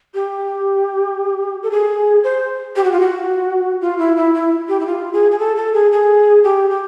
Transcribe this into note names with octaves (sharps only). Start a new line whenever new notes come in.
G4
A4
G#4
C5
G4
F#4
F4
F#4
F4
E4
E4
E4
G4
E4
F4
G#4
G#4
A4
A4
G#4
G#4
G4
G4